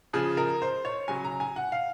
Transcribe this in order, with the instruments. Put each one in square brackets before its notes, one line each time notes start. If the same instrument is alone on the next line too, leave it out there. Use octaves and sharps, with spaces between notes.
[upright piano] C#3 F3 G#4
A#4
C5
C#5
C#3 F#3 G#5
A#5
G#5
F#5
F5